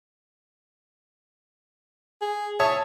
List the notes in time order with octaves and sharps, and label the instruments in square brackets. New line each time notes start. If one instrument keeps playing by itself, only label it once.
[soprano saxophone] G#4
[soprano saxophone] C#5 [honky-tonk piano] E5 A5 D#6